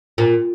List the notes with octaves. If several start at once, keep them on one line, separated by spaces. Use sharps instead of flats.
A#2